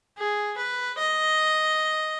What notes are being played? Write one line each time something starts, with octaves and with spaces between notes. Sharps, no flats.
G#4
B4
D#5